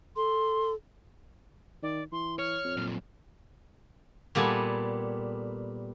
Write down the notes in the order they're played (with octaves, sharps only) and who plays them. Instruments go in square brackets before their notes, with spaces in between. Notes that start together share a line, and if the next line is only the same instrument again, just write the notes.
[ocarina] A4 [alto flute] C6
[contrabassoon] D#3 [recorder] D5
[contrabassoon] E3 [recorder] C6
[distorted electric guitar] C#5 [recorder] F6
[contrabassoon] F2
[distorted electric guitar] A#2 F#3
[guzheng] A#2 G3 B3 A4 G#5